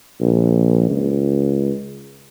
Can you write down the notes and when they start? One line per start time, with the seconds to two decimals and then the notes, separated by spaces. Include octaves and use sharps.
0.21 A#1
0.90 C#2